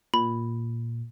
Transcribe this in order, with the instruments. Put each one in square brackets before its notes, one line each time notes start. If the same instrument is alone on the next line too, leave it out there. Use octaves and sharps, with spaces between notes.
[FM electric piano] A#2 [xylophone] B5